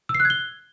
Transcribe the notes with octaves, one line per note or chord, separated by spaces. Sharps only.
E6
C7
F#6
G#6
G7